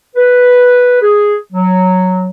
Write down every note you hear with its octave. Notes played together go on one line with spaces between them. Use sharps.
B4
G#4
F#3